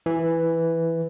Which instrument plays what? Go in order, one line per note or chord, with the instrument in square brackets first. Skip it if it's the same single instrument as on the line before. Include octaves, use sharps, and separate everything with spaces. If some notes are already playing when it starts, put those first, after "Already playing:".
[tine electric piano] E3